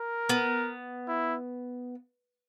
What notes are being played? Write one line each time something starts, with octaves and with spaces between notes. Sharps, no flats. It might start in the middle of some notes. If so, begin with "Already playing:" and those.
Already playing: A#4
B3
E4